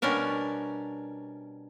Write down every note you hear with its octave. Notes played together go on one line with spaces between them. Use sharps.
B2 G3 C#4 D4 A#4